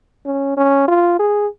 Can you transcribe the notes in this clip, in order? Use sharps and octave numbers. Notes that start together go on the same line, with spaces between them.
C#4
C#4
F4
G#4